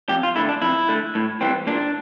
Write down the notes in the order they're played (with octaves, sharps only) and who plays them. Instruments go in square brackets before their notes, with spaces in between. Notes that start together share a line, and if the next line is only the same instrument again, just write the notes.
[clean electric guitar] F2 G4
F4
D3 A3 E4
D4
F2 E4
D3 A3
A2
E3 G3 C4
A#2 D4